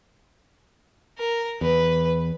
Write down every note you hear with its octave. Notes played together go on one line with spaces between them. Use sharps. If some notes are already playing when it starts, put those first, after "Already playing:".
A#4
E2 B4